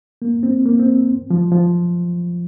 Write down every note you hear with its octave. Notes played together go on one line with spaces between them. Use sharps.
A#3
C4
A#3
C4
F3
F3